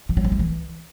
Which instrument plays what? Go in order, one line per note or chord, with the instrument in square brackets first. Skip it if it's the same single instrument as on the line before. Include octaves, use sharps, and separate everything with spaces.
[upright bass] E3
F#3
F3
A3
E3